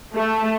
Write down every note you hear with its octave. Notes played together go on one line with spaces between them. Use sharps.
A3